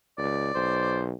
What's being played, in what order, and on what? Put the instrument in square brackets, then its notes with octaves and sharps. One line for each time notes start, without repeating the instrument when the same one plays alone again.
[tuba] C#2 [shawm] D5
[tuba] B1 [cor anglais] C5